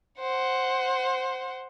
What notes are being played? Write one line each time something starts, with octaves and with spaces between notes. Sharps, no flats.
C5 F#5